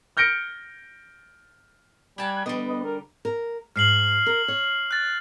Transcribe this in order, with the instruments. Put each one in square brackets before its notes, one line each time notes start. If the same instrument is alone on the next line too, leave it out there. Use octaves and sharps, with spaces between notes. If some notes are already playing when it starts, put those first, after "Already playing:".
[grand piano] F6 G6 A#6 C#7 D7
[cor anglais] G3 [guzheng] G4 A5 [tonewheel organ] G#5 F#6 G#6
[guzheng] D3 G3 [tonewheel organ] B3 B4 [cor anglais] D#5
[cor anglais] D#5
A#4
[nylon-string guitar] A#4
[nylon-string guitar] G#2 [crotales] F6 C7 F#7
[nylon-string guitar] A#4
C#5
[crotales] F#6 A6